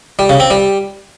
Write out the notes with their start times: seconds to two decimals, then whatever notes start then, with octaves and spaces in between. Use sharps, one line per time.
0.19 G3
0.29 C#3
0.40 C4
0.50 G3